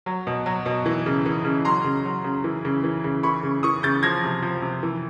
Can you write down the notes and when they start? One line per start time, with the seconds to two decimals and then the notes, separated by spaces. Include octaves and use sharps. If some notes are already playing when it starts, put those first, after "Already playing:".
0.06 F#3
0.27 B2
0.46 F#3
0.66 B2
0.86 E3
1.06 C#3
1.26 E3
1.45 C#3
1.65 F#3 A#5 C6
1.84 C#3
2.05 F#3
2.24 C#3
2.44 E3
2.65 C#3
2.84 E3
3.04 C#3
3.23 E3 B5 C#6
3.43 C#3
3.63 E3 C#6 D#6
3.83 C#3 G6 A6
4.03 F3 G#6 A#6
4.24 C3
4.43 F3
4.62 C3
4.83 E3